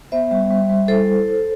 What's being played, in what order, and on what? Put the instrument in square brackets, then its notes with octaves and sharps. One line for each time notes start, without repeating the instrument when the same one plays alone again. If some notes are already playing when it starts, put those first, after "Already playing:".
[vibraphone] B3 C5 E5
G3
G3
G3
E4 A4 C5